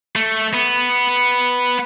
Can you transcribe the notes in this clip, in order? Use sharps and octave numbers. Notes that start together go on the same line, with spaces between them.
A3
B3